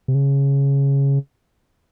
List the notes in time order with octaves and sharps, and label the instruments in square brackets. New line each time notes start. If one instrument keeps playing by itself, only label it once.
[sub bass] C3
C#3